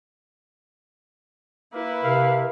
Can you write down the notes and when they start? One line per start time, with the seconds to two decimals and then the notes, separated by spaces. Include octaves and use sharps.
1.73 A#3 E4 B4
2.03 C3 A#4 F5